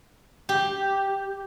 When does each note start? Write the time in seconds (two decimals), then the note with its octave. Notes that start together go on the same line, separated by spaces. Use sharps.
0.49 G4